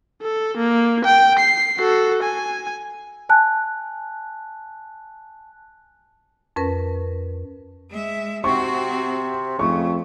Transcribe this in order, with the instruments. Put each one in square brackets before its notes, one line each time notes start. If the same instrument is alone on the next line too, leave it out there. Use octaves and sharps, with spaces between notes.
[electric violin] A4
A#3
G5
C7
F#4 A4
G#5
[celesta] G#5 A5 F#6
[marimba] F2 C#4 A#4 B4
[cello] G#3 E5
[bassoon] C3 [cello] C4 F#4 [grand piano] C#6
[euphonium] F2 [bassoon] C#3 [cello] A3 [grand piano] C#6